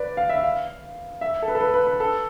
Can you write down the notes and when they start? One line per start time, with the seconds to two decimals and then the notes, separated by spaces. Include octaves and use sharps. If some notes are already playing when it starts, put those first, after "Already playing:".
Already playing: B4 D5
0.17 F5
0.29 E5
0.43 F5
1.21 E5
1.43 A4
1.48 B4
1.55 A4
1.61 B4
1.74 B4
1.87 B4
2.00 A4